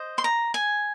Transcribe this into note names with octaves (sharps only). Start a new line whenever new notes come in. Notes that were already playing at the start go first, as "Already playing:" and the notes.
Already playing: C5 D#5
C6
A#5
G#5